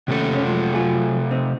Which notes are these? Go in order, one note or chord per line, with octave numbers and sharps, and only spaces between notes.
D#2 C3 A3 C#4 A4
C#3 C#4
F3 F#3 G#3
F#3 F4 G#4
C4 D#4